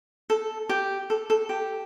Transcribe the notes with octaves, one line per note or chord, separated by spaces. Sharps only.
A4
G4
A4
A4
G4